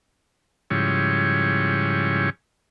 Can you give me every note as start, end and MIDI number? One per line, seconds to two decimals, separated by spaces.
0.70 2.30 44
0.70 2.30 49
0.70 2.30 53
0.70 2.30 55
0.70 2.30 64
0.70 2.30 73